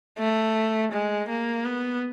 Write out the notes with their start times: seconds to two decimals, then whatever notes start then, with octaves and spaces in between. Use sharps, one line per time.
0.18 A3
0.92 G#3
1.29 A#3
1.65 B3